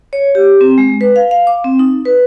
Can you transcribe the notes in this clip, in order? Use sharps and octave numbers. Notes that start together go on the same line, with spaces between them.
C#5
G4
C4
G#3
B4
F5
F5
D6
C4
D#4
B4